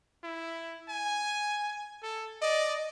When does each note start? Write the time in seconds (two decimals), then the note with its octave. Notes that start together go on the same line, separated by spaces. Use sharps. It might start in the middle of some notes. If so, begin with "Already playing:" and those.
0.24 E4
0.89 G#5
2.02 A4
2.42 D5 D#5